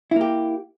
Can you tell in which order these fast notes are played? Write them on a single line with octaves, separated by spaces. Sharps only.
E4 A#3 G4